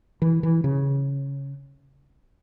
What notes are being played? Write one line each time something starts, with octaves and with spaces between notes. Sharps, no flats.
E3
E3
C#3